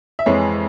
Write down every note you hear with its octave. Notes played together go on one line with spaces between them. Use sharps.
E5
F2 E3 G#3 C#5